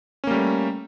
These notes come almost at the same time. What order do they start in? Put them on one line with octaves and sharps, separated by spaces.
C#4 A#3 G3 A3